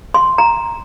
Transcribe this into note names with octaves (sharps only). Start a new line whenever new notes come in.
C6
A#5